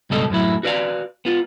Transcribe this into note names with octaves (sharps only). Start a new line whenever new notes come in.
C#2 G2 B2 A4 D#5
F#2 A2 F#3 E4
F#4 B4 D5 F5
B3 F4